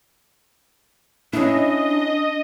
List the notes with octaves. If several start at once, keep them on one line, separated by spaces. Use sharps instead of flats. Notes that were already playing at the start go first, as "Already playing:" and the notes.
C#4 D4 E4 D#5